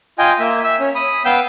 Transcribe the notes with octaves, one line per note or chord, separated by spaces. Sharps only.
F4 D#5 G5 G#5
A#3 E5
E5 E6
C#4
B5 D#6
B3 F5 G5 E6 G6